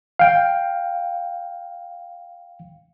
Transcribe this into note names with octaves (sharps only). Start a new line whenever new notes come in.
F5 G5